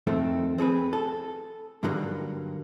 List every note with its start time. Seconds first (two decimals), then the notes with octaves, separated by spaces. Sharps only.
0.07 F2 D#3 A3 C4
0.58 C4 G#4 A4 B4
0.93 A4
1.83 G2 D3 D#3 F#3 G3 A#3